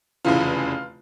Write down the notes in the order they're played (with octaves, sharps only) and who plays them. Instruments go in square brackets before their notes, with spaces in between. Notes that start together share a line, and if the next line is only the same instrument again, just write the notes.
[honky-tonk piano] F1 E2 C#3 E3 F4